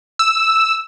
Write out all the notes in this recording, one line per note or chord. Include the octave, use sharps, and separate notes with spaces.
E6